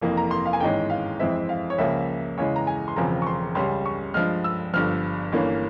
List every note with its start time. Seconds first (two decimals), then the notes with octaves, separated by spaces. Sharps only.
0.01 F1 F2 E3 A#3
0.17 A#5
0.31 C6
0.46 F5
0.53 G#5
0.60 G#1 G#2 E3 G#3 C#4 G5
0.90 F5
1.19 F2 E3 G#3 C4 E5
1.49 F5
1.70 C#5
1.78 C#2 C#3 F3 A#3 C#4 E5
2.38 E2 C#3 E3 G#3 C#5
2.56 A#5
2.67 G#5
2.88 C6
2.96 E1 E2 C#3 F3 C4 A#5
3.22 C#6
3.27 C6
3.55 C#2 C#3 G3 C#4 C6
3.85 C#6
4.14 G2 F3 G#3 F6
4.44 E6
4.73 G1 G2 F3 F6
5.33 G1 G2 E3 A#3 C#4